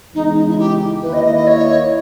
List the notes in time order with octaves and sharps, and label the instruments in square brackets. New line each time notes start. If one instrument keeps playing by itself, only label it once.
[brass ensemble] E2 C#3 G#3 [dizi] D#4
[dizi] D#4
E4
G4
[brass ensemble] D#2 D#3 A#3 E4 [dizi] B4
[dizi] D#5
D#5
D#5
C#5